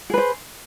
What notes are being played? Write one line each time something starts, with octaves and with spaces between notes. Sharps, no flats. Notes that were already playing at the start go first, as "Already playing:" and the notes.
G#4 B4 C5